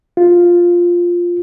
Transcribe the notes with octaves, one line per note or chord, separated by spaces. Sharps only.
F4